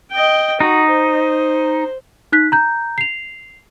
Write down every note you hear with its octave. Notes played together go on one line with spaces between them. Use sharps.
D#5 G5
D#4 F#4
C5
D#4 F#6 B6
A#5 G6
C7 F7